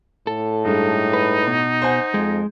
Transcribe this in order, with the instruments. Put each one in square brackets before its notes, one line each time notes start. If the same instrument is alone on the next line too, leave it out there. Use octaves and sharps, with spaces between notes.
[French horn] A2 [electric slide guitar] A4
[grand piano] G2 G#3 [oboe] D#4
[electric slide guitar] B4
B2
[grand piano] C5 F#5 G#5
[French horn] F2 [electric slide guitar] G#3